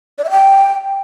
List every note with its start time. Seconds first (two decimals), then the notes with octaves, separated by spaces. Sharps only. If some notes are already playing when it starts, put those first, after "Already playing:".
0.18 D5
0.24 E5
0.30 G5